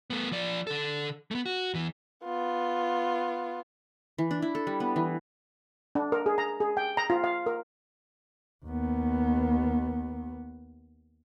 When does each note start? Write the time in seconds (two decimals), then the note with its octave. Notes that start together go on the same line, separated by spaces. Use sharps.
0.10 A3 B3
0.32 F3 D5
0.67 D3 A4
1.31 A3 B3
1.46 F#4
1.74 E2 E3
2.24 B3 F4
4.18 E3
4.31 D4
4.42 E4
4.55 A4
4.67 G3
4.80 B3
4.96 E3
5.95 D4
6.12 A#4
6.26 G#4
6.38 A#5
6.60 G#4
6.77 G5
6.97 A#5
7.10 F4
7.24 F5
7.46 A#4
8.66 D#2 B3